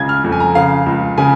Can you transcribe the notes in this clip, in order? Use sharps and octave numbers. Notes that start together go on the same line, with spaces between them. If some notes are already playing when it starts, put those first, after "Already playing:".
Already playing: C#2 C#3 G#6
F6
F2
G#5
A#5
C#3 F5
C#2
C#3 G#5